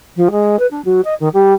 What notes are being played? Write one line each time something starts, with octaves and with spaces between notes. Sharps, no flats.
F3
G#3
B4
D4
F#3
D#5
D#3
G3